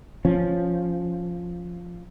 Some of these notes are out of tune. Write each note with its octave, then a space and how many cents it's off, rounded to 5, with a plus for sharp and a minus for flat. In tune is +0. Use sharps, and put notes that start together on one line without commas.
F3 +0 C#4 +0